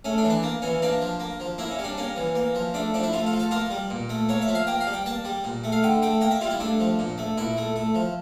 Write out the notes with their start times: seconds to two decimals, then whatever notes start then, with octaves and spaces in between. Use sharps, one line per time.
0.05 A3 C#4
0.18 D4
0.24 E3
0.30 D4
0.43 A#3
0.62 E3 C#4
0.82 A#3 D4
1.01 F3
1.20 A#3
1.40 F3
1.58 A#3 E4
1.71 C#4
1.79 G3
1.84 D4
1.98 A#3 C#4
2.16 E3
2.35 A#3
2.55 F3
2.74 A3 D4
2.94 F3 D4
3.03 E4
3.13 A3 F4
3.27 F4
3.33 F3
3.39 A4
3.51 A#3 F4
3.71 G3
3.90 A#2
4.10 A3
4.29 A#3 C#5
4.42 E5
4.48 F3
4.55 F5
4.67 A#3 G5
4.81 F5
4.87 G3
4.93 G5
5.06 A#3 A5
5.25 G3
5.44 A#2
5.64 A3
5.72 F5
5.83 D3 G5
6.02 A3 G5
6.21 A#3 G5
6.31 E5
6.41 G3 F4
6.51 E4
6.60 A3 D4
6.80 F3
6.99 A#2
7.18 A3
7.38 A#2 E4
7.57 A3
7.76 A3
7.95 F3